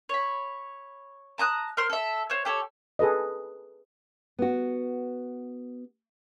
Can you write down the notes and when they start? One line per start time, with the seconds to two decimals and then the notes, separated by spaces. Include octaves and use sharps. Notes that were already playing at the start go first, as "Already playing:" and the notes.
0.09 C#5 B5
1.38 A5 A#5 D#6 F#6
1.77 A#4 C5 C6 F6
1.90 A4 E5
2.30 C5 C#5
2.45 G4 A4 C#5
2.99 G#4 A4 B4 D#5
4.39 B3 F#4